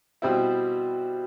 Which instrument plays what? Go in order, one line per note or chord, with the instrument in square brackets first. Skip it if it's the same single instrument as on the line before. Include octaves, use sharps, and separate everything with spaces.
[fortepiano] B2 G3 C4 E4